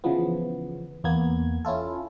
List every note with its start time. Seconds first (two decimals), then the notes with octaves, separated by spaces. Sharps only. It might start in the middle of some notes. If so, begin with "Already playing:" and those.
0.04 C#3 E3 F3 B3
1.04 E2 A#3 B3 G#6
1.65 C#4 E4 F4 A4